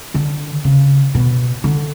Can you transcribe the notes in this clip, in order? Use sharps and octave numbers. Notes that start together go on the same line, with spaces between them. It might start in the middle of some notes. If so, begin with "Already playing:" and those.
D3
C#3
B2
D3